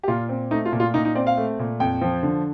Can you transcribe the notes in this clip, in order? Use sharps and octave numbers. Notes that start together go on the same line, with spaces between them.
G4
A#2 F4
C4
A3 D#4
F4
A#2
F4
A#2 D#4
D#4
C4 D5
F5
A3
A#2
F2 G5
F3
D3